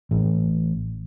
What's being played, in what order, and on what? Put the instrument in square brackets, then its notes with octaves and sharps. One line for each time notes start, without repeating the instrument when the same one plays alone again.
[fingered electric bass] A1